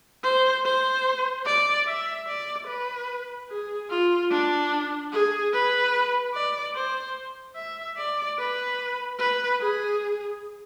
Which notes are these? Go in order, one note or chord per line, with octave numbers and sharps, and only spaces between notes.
C5
C5
D5
E5
D5
B4
G#4
F4
D4
G#4
B4
D5
C5
E5
D5
B4
B4
G#4